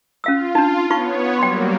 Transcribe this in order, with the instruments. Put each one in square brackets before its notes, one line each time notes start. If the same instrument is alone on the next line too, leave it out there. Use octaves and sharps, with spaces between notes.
[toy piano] C#4 F5 E6 [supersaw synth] F4
[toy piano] D4 D#4
[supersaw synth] B3 C#5 [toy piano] D#4 F4 C#6
[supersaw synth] F#3 G3 A#3 [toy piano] G5 C6